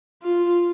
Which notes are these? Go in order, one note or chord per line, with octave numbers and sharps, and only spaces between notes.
F4